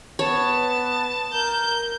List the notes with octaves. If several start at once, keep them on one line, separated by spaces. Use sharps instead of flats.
B3 C#5 A5
A#4 G6